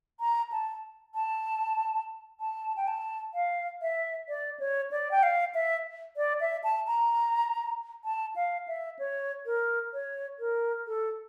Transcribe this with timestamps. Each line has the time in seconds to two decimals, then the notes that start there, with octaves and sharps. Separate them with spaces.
0.20 A#5
0.52 A5
1.15 A5
2.40 A5
2.77 G5
2.88 A5
3.34 F5
3.82 E5
4.28 D5
4.60 C#5
4.91 D5
5.11 G5
5.23 F5
5.54 E5
6.17 D5
6.41 E5
6.64 A5
6.87 A#5
8.04 A5
8.36 F5
8.68 E5
8.99 C#5
9.46 A#4
9.93 C#5
10.40 A#4
10.87 A4